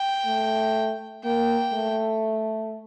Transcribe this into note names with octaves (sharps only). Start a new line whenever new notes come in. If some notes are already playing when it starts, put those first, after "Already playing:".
Already playing: G5
A3
A#3 G5
A3